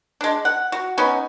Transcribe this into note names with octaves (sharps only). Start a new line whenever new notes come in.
G#3 D4
F#5
F#4
B3 C#4 D#4